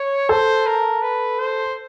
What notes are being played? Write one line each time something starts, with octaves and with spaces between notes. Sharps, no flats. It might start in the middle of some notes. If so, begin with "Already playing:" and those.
Already playing: C#5
A4 C5
A#4
B4
C5